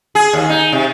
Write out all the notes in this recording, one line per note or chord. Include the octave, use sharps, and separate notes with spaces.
G#4
D#2
D#4
C3